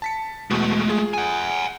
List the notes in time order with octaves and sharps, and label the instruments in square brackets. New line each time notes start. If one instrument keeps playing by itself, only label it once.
[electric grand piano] A5 B6 C#7
[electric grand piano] E2 B2 [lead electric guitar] G#3 A3
[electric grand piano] F4 G#4
[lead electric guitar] F#5 G#5